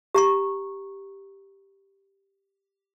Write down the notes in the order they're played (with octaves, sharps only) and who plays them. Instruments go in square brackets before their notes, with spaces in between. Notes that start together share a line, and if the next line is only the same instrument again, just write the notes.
[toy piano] G4 A#5 C#6